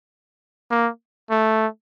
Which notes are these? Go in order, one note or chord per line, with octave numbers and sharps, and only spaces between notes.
A#3
A3